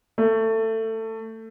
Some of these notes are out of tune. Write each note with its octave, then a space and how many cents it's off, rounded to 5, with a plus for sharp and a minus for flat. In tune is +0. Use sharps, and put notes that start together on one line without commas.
A3 +20